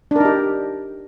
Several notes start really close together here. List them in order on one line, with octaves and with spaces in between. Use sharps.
D4 A#4 D#4 G4